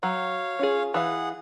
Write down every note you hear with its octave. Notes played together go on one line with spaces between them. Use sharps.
F#3 C#5 F5
C#4 F4 G#4
E3 G#4 F5 F#5